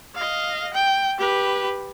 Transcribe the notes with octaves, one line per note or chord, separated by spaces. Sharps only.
D#5 F5
G5
G4 B4